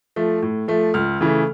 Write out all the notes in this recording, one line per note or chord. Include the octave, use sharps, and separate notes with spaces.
F3 A3
A2
F3 A3
C#2 F6
C#3 E3 A3